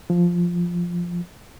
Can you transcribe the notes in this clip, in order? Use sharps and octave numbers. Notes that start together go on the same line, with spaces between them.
F3